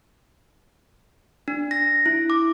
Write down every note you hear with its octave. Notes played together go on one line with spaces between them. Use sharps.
D4
A#6
E4
D6